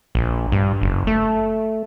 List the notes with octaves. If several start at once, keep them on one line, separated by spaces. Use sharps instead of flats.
A#1
G2
F#1
A3